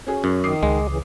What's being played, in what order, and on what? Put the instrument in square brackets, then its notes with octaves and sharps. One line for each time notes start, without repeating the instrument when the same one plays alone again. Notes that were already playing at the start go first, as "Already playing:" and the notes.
[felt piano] C#4 F#4 G#4
[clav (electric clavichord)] F#2
[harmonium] D#3 [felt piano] D6 D#6 C7
[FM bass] C#2 [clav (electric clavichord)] G#3
[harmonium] C#3 E3